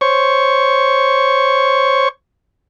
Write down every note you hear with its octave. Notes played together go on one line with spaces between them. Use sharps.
C5 C#5 C#6